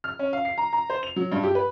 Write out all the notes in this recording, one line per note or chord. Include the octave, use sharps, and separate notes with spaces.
F6
C#4
F5
C7
A#5
A#5
C5
F7
F#3
G2
G4
B4